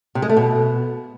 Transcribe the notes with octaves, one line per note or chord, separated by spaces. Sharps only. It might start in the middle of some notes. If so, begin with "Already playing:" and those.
C3
G#3
A3
B2